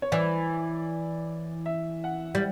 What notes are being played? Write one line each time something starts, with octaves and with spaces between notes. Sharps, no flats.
C#5
E3 D5
E5
F#5
G3